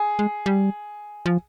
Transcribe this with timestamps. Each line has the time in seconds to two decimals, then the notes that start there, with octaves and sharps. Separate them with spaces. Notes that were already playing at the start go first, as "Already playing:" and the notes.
Already playing: G#4
0.19 G#3
0.46 G3
1.26 F3